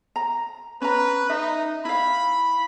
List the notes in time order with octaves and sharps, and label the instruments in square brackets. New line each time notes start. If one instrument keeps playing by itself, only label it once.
[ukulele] A#5
[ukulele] C#4 A#5 [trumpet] B4
[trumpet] D#4 [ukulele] E5
[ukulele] E4 F5 [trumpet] B5